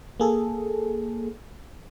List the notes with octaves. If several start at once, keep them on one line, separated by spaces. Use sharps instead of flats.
A#3 G#4 A4